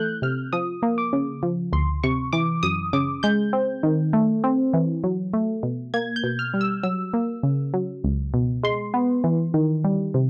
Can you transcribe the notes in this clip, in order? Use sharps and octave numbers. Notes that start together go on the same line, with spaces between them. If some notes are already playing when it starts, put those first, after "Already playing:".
Already playing: E3 A3 F#6 G6
C3 F6
F3 D#6
A#3
D6
C#3
F3
D2 C6
C3 C#6
E3 D6
F#2 D#6
C#3 D6
G#3 G6
C4
D#3
A3
C4
E3
F#3
A3
B2
A#3 G#6
G6
B2
F6
G3
E6
F#3 E6
A#3
C#3
F#3
C#2
B2
G#3 C6
B3
E3
D#3
G3
C3